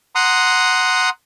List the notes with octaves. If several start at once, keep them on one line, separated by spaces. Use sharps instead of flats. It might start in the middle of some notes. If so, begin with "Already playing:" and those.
F#5 A#5 C6 D#6